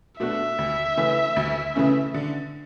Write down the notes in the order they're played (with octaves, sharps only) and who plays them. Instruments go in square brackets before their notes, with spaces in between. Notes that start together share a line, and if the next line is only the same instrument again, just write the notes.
[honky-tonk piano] B2 A3 D4 F#4 [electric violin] E5
[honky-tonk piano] D2
C#3 E3 A3 C#4
D2
C#3 E3 A3 C#4
D3